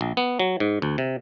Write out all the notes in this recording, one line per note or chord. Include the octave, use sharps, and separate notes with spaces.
A#1
B3
F#3
G#2
D2
C3